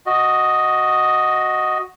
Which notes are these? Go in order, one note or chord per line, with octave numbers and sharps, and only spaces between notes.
F#4 D#5